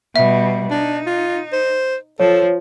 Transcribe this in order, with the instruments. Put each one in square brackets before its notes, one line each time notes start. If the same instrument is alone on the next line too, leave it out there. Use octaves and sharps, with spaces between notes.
[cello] B2 G3 [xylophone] E5
[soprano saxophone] D4 [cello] D#4
[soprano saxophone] F4
C5
[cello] F3 [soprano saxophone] A4 [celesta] C#5